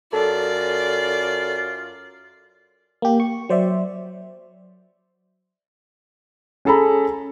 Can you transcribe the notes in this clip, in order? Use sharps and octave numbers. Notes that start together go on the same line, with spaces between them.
F#2 F4 A4 D5
A#3 G4
C#6
F#3 C5 D5 E5
C#4 G#4 A4 A#5 B5